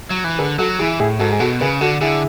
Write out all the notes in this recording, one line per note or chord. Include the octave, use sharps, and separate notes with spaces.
F#3
E3
D3 G#4 B4
F#3 F#4 A4
E3 E4 G#4
A2 E4 G#4
G#2 F#4 A4
G#4
B2 F#4 A4
C#3 G#4 B4
D3 F#4 A4
D3 E4 G#4